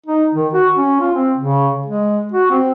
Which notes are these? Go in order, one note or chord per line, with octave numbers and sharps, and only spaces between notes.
D#4
D#3
F#4
C#4
F4
C4
C#3
G#3
F#4
C4